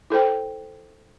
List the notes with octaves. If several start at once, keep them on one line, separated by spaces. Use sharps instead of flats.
E4 A4 C5 G5